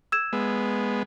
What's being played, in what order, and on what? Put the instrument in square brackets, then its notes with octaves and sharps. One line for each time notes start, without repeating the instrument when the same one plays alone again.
[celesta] E6 G#6 E7
[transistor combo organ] G#3 B3